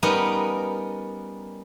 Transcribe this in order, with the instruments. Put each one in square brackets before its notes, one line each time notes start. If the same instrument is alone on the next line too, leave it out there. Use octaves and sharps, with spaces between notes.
[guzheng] G3 B3 C#4 D#4 G4 A#4